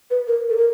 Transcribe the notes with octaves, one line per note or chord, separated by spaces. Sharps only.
B4
A#4
A4
A#4